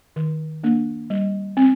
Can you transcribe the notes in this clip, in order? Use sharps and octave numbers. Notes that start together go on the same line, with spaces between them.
D#3
A#3 D4
G3
C4